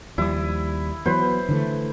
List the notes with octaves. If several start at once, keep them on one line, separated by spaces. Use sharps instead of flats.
D#2 F3 G3 E4 D#6
E3 F#3 B3 B4 C5
D3 E3 A3